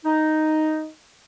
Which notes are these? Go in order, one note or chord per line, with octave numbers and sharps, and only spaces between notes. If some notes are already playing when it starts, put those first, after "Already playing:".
D#4